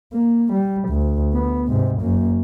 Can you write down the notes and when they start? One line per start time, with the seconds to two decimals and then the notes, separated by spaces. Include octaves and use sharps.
0.13 A#3
0.53 G3
0.89 D2
1.34 B3
1.69 G#2 C3
2.02 F#2 A#3